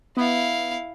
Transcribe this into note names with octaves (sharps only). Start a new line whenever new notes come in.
B3 E4 F5